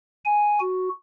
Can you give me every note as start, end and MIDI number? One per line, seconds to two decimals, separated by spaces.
0.25 0.59 80
0.60 0.89 66